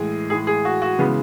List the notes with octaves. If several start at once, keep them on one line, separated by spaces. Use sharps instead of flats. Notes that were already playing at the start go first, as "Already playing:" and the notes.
Already playing: A2 E3 G#3 G#4
A2 E3 G#3 G#4
G#4
F#4
F#4
C#3 E3 G#3 B3